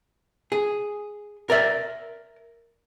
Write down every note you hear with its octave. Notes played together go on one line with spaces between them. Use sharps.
G#4
A#4 D5 E5